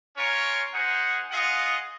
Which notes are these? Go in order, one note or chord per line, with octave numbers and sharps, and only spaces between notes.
C#4 F4 A#4 C#5
D#4 G#4 C5 F#5
F4 G#4 D#5 F#5